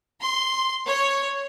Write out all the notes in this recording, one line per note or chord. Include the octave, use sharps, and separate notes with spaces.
C6
C#5